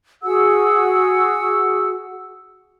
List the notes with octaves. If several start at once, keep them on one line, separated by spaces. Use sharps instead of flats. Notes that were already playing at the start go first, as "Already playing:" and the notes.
F#4 G#4 F#5 E6